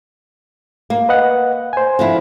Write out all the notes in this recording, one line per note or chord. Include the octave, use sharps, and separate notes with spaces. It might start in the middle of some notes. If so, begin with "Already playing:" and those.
A#3
B4 D#5 F#5
C5 G#5
D3 F3 E4